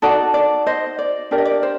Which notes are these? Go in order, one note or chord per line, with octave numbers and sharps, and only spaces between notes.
D#4 F#4 A4 D5
D5
C5 D#5
D5
D4 G4 A#4 D5
D#5
D5
C5